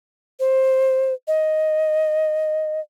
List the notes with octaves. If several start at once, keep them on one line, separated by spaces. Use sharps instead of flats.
C5
D#5